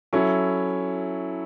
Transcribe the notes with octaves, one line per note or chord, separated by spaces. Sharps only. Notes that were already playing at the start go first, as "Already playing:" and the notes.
F#3 C#4 E4 A4